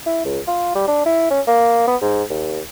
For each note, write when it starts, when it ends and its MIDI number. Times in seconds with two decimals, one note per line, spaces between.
0.06 0.22 64
0.25 0.39 37
0.47 0.73 65
0.75 0.87 55
0.88 1.02 62
1.06 1.27 64
1.30 1.41 61
1.47 1.86 58
1.87 1.96 59
2.02 2.23 44
2.30 2.60 39